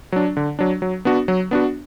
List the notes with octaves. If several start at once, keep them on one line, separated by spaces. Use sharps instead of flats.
F#3 D4
D3
F#3 D4
F#3
B3 D4 F#4
F#3
B3 D4 F#4